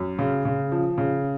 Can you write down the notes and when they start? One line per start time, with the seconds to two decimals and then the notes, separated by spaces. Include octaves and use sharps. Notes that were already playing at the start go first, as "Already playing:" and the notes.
Already playing: F#2
0.19 C#3
0.45 C#3
0.72 F3
0.98 C#3